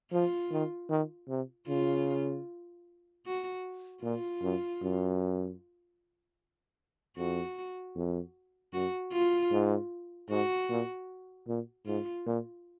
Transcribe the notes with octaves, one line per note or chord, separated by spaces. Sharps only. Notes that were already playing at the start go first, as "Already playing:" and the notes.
F3 F4
D#3
D#3
C3
C#3 F4
F#4
A#2 F4
F#2
F#2
F2 F#4
F2
F#2 F#4
F4
G#2
G#2 F#4
A#2
A#2
G#2 F4
A#2